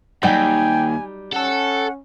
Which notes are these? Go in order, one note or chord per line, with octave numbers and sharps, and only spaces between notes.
D#2 G#2 F#3 G3 D#4 G5 G#5
C#4 A4 F#5 A5